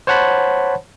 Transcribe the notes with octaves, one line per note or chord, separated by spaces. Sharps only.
C5 C#5 F#5 A5 B5